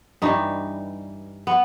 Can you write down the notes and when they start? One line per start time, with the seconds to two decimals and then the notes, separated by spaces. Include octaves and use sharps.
0.22 G2 E3 G3 D#4
1.47 B3